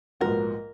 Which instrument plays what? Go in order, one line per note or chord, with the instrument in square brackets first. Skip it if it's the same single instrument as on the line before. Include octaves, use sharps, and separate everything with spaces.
[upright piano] A#1 G#2 F3 B3 F#4 [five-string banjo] A#4